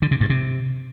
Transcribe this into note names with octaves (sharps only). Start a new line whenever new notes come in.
D3
C3
G2
C3